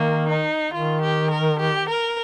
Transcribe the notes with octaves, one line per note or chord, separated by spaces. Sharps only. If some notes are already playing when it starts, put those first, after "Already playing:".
Already playing: D#3 A#3
D#4
D#3 F4
G4
A#4
G4
A#4